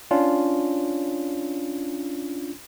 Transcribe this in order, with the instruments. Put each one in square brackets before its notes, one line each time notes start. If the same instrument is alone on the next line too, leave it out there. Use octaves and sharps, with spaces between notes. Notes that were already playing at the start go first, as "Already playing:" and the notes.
[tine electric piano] C#4 D4 F4